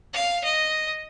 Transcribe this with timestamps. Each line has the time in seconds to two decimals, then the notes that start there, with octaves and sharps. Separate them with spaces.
0.14 F5
0.44 D#5